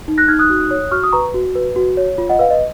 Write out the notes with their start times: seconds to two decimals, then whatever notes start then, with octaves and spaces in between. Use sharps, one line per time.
0.08 D#4
0.18 F#6 A#6
0.28 D#4 F6 G#6
0.39 D#6 F#6
0.50 F#4
0.71 C#5
0.91 F#4 C#6 F6
1.03 D#6
1.12 B4 A#5 C#6
1.34 F#4
1.55 B4
1.76 F#4
1.97 C#5
2.18 F4
2.29 D#5 F#5
2.39 B4 F5
2.50 D#5